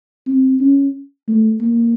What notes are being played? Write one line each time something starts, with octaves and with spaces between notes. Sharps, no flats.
C4
C#4
A3
A#3